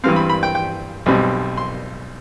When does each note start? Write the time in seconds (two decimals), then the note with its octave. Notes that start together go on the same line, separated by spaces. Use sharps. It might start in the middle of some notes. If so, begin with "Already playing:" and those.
0.04 G2 E3 G3 C4 F5
0.16 B5
0.30 B5
0.43 G5
0.55 G5
1.06 B1 B2 G3 C4
1.57 C6